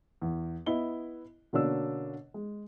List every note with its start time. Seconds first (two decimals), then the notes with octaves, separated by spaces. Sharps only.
0.22 E2
0.66 B3 E4 D#5 G7
1.53 B2 D3 A#3 C#4 D4 E6
2.34 G#3